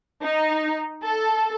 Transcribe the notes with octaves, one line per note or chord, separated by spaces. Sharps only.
D#4
A4